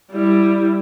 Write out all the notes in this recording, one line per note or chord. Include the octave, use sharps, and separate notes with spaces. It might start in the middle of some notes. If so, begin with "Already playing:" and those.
G3 E4